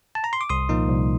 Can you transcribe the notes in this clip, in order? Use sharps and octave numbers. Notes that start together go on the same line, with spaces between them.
A5
A#5
C6
D6
C2 C6 D#6
A#2 F3 A#3 D#4
C2